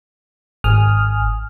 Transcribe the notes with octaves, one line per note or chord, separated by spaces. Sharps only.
G#1 G#5 D#6 F6